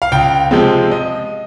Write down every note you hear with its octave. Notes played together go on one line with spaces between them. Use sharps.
F5
C#2 G5
C3 F3 G#3 C4
D#5